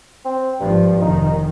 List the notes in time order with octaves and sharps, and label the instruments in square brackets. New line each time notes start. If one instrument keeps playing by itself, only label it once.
[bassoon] C4
[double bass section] G#1 F3 [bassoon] G2
[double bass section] F1 D#3 [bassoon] D#4